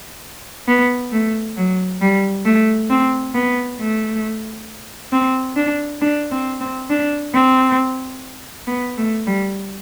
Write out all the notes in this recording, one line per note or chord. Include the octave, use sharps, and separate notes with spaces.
B3
A3
F#3
G3
A3
C4
B3
A3
C4
D4
D4
C4
C4
D4
C4
B3
A3
G3